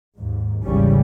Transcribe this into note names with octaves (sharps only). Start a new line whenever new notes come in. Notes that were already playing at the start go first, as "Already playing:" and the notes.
D#2 G#2
G#1 D#2 C#3 E3 G3 C#4